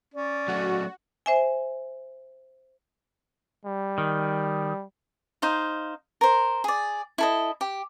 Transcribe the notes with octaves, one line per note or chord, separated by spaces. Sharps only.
C#4 D5
F#3 A3 F#4
C5 E5 G#5
G3
D#3
D#4 C5 F5
A#4 C5
G#4 D5
E4 A4 D#5
G4